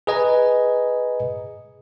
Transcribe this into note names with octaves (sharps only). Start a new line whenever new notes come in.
G#4 B4 D#5 G#5 A#5